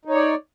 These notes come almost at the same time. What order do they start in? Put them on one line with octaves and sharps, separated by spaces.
D#4 C#5 D5